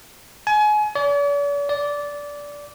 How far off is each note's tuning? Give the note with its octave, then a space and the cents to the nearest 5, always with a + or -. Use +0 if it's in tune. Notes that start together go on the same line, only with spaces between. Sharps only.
G#5 +30
D5 -45
D5 -15